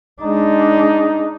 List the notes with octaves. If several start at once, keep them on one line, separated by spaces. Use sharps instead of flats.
G#3 D4 D#4